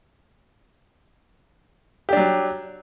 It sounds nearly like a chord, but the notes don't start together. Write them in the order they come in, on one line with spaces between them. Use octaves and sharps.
G4 D4 F#3